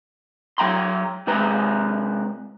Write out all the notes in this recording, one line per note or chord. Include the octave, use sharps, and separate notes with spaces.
F#3 G5 A#5 C6
C3 G#3 B4 A#5